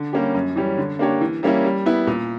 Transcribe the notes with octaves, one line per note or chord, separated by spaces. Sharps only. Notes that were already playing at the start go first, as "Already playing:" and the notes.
Already playing: D3
G3 A#3 C#4 G4
F#2
E3 G3 C#4
D3
A#3 D4 G4 C#5
E3
G3 A#3 C#4 E4
G3
B3 E4
A#2